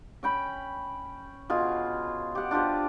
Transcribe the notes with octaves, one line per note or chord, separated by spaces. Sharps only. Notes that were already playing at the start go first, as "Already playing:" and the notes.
C#4 G5 B5
B2 F4 G#4
G4 F#5
D4 F4 G4 C5